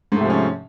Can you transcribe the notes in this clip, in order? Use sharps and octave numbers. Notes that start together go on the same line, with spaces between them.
G#2 C3 F3 A3 C#4